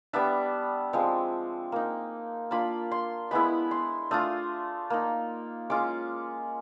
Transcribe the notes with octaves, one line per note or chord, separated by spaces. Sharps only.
G3 B3 D4 E5
F3 G#3 C4
A#3 D#4
A#3 D4 F4 B5
C6
G#3 B3 E4 B5
C6
A3 D4 F4 D#6
A#3 D#4
G#3 C#4 F4 D6